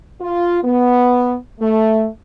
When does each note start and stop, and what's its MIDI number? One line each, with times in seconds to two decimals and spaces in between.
0.21 0.59 65
0.64 1.35 59
1.60 2.06 57